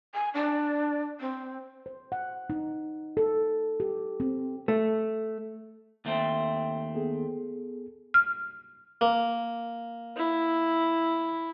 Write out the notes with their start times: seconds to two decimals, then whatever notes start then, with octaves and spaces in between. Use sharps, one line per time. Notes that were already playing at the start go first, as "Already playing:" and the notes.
0.14 G#5
0.34 D4
1.21 C4
1.86 C5
2.12 F#5
2.50 D#4
3.17 A4
3.80 G4
4.20 C4
4.68 A3
6.05 D#2 A3 C4
6.95 B3 G#4 A4
8.14 F6
9.01 A#3
10.16 E4